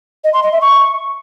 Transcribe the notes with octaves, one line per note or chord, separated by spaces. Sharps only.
D#5
C6
D#5
E5
C#6